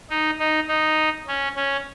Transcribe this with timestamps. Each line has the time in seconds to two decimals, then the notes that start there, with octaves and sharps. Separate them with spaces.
0.10 D#4
0.39 D#4
0.68 D#4
1.28 C#4
1.56 C#4